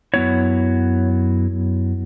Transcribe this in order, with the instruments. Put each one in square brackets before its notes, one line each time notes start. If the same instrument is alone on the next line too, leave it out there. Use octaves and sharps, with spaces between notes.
[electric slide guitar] F#2 F#3 B3 E4 C#5